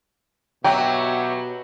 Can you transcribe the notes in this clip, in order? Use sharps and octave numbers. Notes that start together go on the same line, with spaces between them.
B2 F#3 G4 C#5 E5 G5